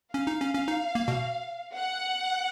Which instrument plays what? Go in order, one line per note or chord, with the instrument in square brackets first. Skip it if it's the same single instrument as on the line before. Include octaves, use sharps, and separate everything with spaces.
[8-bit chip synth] C#4 [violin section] F5
[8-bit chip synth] D#4
C#4
C#4
D#4
A#3
B2
[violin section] F#5